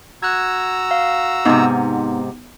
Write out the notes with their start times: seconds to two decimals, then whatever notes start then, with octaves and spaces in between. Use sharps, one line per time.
0.23 F#4 A#5 E6 F#6 G#6
0.91 F5
1.45 G#2 C3 B3 D#4